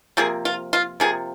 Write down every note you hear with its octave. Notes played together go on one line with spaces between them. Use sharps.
C3 F3 A#3 G#4
F4
F4
C3 F3 A#3 G#4